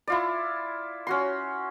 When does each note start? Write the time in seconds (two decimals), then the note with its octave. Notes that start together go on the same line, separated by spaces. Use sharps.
0.08 E4 F4 D5
1.07 C#4 F#4 C6